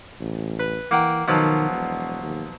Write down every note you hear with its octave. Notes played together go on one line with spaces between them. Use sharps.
A1
B4
E3 A#3 F#5 G5
B2 D#3 F3 F#3
E1
D#2